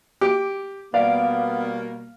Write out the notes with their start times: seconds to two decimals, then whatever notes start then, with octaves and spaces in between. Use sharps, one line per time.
0.21 G4 D6 D7
0.94 B2 G3 A#3 B3 D5 F5 D7